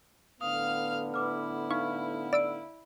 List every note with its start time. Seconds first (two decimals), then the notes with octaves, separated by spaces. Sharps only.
0.41 A2 D3 B3 F5 D#6 F6
1.14 E4 B4 D6 F6
1.71 D#4 F5 C#6 F6
2.33 D5 E6 D7